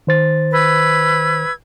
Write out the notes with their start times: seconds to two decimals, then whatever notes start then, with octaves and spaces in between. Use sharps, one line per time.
0.07 D#3 C5 A6
0.52 B4 E6 G#6